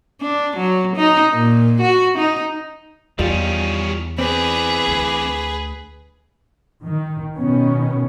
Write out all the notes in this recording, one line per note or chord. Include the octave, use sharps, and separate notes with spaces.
D4
F#3
D#4
A#2
F#4
D#4
E2 D#3 G3 C#4 F4
E3 C4 G#4 B4 D5
D2
D#3
B2 D#3 B3 C#4